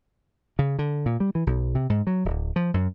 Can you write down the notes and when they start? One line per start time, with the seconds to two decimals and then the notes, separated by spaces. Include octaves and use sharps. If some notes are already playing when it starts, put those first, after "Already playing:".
0.59 C#3
0.79 D3
1.06 A#2
1.20 G3
1.35 E3
1.47 B1
1.75 C3
1.90 G#2
2.07 F#3
2.25 D1
2.56 F3
2.74 F#2